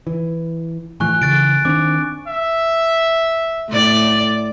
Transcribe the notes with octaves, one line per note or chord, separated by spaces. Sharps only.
E3
A2 E3 F3 G#5 C#6 F#6
C#3 E3 F#6 A6 D7
D#3 C4 D4 D6
E5
A2 D5